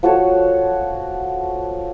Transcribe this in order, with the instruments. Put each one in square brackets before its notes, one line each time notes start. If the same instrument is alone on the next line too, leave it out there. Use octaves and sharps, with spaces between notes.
[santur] F3 F#4 A4 C#5